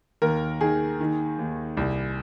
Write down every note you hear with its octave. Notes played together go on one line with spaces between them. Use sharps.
D#2 A#4
D#3 G#4
D#3
D#2
C2